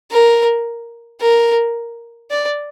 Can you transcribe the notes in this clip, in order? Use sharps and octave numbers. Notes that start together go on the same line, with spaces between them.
A#4
A#4
D5